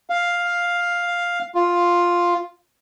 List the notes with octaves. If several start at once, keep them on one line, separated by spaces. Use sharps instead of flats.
F5
F4